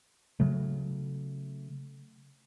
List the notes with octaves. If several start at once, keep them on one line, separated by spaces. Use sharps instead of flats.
C#3 F#3 A3